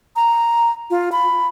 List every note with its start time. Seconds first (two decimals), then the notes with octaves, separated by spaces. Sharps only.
0.16 A#5
0.90 F4
1.12 B5